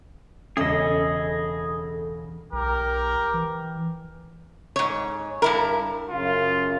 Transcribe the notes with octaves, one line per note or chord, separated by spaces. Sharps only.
E1 C#3 G#4 A4 D#5 E5
B1 G4 A#4
E3
G#2 C#5
G2 E4 A#4
F#2 C#3 F4